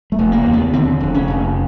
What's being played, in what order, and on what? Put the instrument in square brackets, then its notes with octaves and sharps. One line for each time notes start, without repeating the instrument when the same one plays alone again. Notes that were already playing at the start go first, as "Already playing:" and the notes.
[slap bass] A3
F1
A#3
D#2
B3
D3 C4
F1
C#4
F1